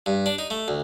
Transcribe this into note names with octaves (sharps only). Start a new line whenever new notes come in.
G2
D4
D#4
A3
D2